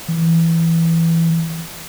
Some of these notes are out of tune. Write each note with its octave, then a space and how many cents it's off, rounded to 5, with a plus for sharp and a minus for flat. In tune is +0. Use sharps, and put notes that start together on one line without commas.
E3 +5